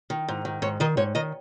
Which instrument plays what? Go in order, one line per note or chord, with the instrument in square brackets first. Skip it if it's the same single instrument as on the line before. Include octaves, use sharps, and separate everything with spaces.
[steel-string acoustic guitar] D#3
G#2
D#3
G#2 C#5
D#3 D#5
G#2 C#5
D#3 D#5